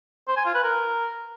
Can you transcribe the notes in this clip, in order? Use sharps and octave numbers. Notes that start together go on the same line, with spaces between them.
C5
G#5
F4
B4
A#4